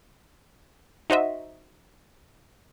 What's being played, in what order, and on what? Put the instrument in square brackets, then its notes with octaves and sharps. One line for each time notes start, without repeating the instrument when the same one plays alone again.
[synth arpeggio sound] D#4 F#4 C5 D#5 E5